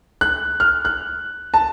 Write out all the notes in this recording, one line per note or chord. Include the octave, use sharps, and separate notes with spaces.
F#6
F6
F#6
A5